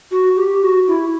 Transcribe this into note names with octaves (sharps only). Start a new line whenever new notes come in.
F#4
G4
F#4
E4